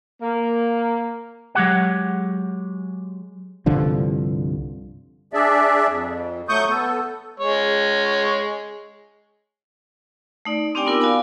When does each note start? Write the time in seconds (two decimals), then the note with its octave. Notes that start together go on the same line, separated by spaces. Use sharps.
0.22 A#3
1.55 F#3 G#3 G4 F#5
3.66 C2 G2 D3 F3
5.33 D4 G#4 D5 E5
5.88 F2
6.49 F#3 A3 C#6 D#6 G6
6.69 B3 A4
7.40 G#3 C#5
10.45 A3 D#4 D5
10.75 C4 D4 G4 D5 G5 G#5
10.86 B3 D#4 F4 A#4 D6 E6
11.01 F#4 D5 F5 G#5 B5 D6